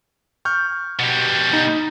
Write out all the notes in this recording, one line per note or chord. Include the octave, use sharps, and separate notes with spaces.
C#6 F6 G6
B2 G3
D#4